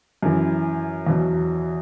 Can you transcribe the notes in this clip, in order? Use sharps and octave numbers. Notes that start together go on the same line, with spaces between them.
F#2 E3
E2 B2 F#3